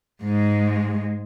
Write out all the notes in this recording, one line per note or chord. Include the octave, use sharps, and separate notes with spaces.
G#2 G#3